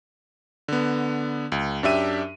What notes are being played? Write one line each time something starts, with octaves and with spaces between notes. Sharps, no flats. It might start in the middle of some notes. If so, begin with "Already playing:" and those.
D3 B3
C#2
F#2 D4 G4 E5 D#7